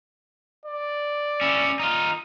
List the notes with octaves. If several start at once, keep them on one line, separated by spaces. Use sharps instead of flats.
D5
C#4 E4
D#4 F4